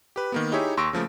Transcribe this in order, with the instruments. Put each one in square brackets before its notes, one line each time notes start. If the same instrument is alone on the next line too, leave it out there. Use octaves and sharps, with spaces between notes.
[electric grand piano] G4 B4
D#3 A#3 B3
D#4 E4 G4 G#4 C#5 E5
D#2 C6 C#6 E6 A#6 D7
C#3 F3 A3 A#3